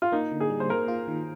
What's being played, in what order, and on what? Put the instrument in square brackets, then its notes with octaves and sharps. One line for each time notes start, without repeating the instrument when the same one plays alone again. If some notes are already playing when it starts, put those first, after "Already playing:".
[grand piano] F4
[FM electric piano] A#3 [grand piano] D#4
[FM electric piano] D3
[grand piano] G#4
[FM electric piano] G3
[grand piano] C5
[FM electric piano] A#3 [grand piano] A#4
[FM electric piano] F4
D#3